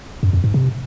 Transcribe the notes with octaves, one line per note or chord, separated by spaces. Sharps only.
F#2
F2
G#2
C3